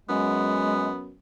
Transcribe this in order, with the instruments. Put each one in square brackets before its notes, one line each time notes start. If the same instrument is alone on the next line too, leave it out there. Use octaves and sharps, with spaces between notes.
[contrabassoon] F#2 [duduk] G#3 [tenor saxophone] B3